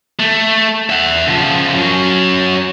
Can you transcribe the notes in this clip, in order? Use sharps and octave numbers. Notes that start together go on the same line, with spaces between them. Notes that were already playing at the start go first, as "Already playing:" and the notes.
A3
E5 F#5
C#3 F3
F#3 C#4